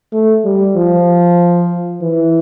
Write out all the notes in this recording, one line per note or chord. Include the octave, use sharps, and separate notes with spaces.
A3
G3
F3
E3